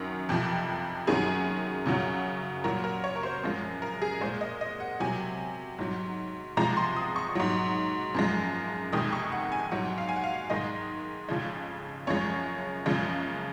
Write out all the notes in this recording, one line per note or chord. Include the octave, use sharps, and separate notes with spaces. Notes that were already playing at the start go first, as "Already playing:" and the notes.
Already playing: F#2 D#3 F#3 A#4
F2 C3 F3
F#2 D#3 F#3 G#4
F#2 C#3 F#3
A#2 F#3 A#4
A#4
C#5
A#4
C5
F#2 F3 G#3
A#4
G#4
A#2 G#3 C5
D#5
D#5
F#5
C3 F#3 G#5
G#2 F#3
C3 F3 G#3 A#5
C6
D#6
C#6
G#2 F#3
F#2 F3 G#3
F2 C3 D#3 G#3 D#6
C#6
F#5
G#5
G#2 F#3 F#5
F5
G#5
F#5
F5
G#2 D#3 G#3 D#5
F2 C#3 F3 G#3
F#2 F3 G#3 C#5
F#2 C#3 F3 G#3